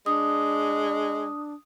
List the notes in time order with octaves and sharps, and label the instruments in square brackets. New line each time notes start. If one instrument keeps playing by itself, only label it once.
[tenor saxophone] G#3 [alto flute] D4 [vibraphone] D#6